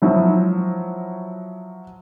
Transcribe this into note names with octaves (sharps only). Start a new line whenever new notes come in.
F3 F#3 E4